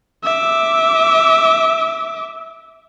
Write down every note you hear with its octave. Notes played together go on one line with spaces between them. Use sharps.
E5 D6